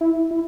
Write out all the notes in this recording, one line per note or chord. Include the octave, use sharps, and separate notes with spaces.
E4
E4